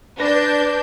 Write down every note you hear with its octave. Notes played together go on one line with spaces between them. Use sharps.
D4 B4 G6 A#6